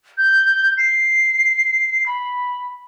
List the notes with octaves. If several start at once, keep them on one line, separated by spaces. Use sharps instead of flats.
G6
C7
B5